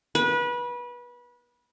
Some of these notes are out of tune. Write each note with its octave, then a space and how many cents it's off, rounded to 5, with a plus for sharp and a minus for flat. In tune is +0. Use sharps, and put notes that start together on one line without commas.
B4 -25